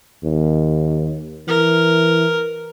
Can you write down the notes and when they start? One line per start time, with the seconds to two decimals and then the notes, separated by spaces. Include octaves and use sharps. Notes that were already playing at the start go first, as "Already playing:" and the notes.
0.23 D#2
1.48 E3 A#4